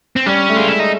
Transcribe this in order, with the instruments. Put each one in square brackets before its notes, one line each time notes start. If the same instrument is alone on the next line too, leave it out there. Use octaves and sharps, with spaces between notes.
[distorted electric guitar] C4
[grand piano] G3 [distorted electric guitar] C#4
[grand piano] A3
[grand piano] G#3 [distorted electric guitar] F4
[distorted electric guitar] E4
D#4